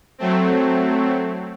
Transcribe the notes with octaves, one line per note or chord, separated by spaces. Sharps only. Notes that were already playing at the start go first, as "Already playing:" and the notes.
F#3 A3 C4